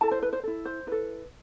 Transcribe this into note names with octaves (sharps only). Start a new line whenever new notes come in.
E4 A4 A5
C5
B4
C5
E4 A4
C5
E4 A4 B4